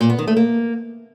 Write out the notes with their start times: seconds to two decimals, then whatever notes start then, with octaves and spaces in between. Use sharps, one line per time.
0.01 A#2
0.10 B3
0.19 D#3
0.28 A3
0.37 A#3